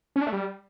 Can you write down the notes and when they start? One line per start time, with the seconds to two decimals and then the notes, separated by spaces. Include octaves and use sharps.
0.16 C#4
0.21 D4
0.27 A3
0.32 G3